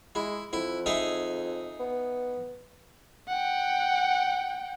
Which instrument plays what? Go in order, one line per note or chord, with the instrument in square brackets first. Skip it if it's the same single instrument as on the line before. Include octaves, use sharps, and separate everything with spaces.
[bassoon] G#3 [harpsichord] E4
[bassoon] F2 [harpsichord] E4
[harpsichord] D#4 G#4 E5
[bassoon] B3
[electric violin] F#5 G5